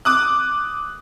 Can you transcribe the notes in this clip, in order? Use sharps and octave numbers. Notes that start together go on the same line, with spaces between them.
D6 D#6 F#6